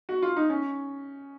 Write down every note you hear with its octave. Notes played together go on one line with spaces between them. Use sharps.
F#4
F4
D#4
C#4